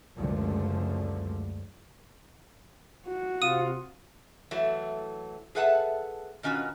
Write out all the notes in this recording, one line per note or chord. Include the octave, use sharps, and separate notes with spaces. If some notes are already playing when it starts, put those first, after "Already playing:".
F#1 C#2 F#2 D3 F3 A3
F#4
C3 F4 D#6 D#7
E3 F#3 A3
G#4 A4 B4 E5 F#5 A5
B2 D#3 C#4 F4 F#4